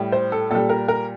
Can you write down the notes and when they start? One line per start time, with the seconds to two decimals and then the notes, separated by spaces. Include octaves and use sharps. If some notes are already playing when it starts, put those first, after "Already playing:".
Already playing: A2 G3
0.12 C5
0.32 A4
0.50 A#2 G3 A4
0.69 A#4
0.88 A#4